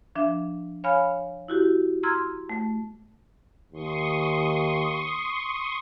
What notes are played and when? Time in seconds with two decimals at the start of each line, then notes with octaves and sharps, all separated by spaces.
0.15 F3 D4 E5
0.84 C#5 F5 G#5 B5 F6
1.48 E4 F#4 G4
2.03 A#5 C6 E6 F6 G#6
2.49 A3
3.73 D#2 C6 C#6 D#6